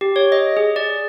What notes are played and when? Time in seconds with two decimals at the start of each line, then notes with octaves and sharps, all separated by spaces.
0.01 G4
0.16 C#5
0.32 D#5
0.57 G#4
0.76 D5